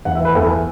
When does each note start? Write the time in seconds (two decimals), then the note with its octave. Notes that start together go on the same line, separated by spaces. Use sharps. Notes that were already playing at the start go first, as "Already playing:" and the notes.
0.05 E2 F#5
0.15 E5
0.20 E3 B4
0.35 E2 A4
0.50 E3